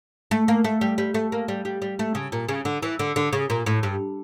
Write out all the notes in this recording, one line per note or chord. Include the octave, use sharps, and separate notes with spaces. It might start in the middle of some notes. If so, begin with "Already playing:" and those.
A3
A#3
A3
G3
G3
A3
A#3
G3
G3
G3
A3
C#3
A#2
C#3
D3
E3
D3
D3
C#3
A#2
A2
G2